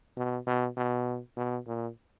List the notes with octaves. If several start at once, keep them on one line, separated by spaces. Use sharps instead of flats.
B2
B2
B2
B2
A#2